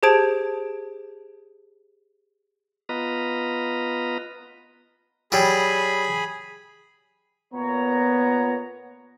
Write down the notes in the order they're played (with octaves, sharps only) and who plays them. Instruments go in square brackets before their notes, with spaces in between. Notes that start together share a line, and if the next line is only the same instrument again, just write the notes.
[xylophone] G4 G#4 C5 A5 G#6 D7
[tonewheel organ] B3 F4 B4 D#5 A#5
[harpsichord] F#3 G3 [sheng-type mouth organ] G#4 B5
[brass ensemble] A#2 C#5 A#5 [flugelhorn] B3